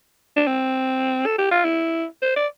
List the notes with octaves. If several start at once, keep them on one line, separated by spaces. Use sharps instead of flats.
D4
C4
A4
G4
F4
E4
C5
D5